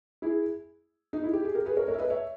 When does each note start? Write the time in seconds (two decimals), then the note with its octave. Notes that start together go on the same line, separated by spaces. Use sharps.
0.22 E4 G#4
1.13 D#4
1.24 E4
1.33 G4
1.45 G#4
1.55 G4 A#4
1.66 G#4 B4
1.77 A#4 C#5
1.88 A#4 C#5
1.94 E5
1.99 B4 D#5
2.10 C#5 E5